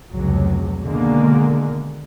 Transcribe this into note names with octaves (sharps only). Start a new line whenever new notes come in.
F1 C#2 F#3
B2 D3 D#3 G#3 A#3